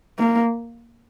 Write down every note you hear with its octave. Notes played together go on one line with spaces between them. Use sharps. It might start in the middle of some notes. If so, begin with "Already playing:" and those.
A#3